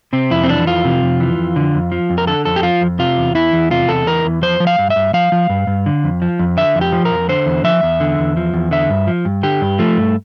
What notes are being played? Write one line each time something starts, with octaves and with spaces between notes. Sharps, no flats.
C3 C4
F2 E4
C4
E3 D4
F2 F4
C3
F2
E3
F2
D3
F2
F3
F2
A#4
D3 A4
F2 A4
G4
F3 F4
F2
C3 F4
E2
E3 E4
E2
C3 F4
E2 A4
E3 A#4
E2
F3 C5
F3
F5
G2
E5
G2
F3 F5
F3
G2
G2
D3
F2
F3
F2
D3 E5
F2
G4
F3
A#4
F2
D3 C5
E2
F3 E5
E2
D3
E2
F3
E2
D3 E5
G2
F3
G2
D3 G4
G2
F3 A3
G2